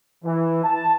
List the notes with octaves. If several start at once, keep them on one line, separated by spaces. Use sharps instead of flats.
E3
A5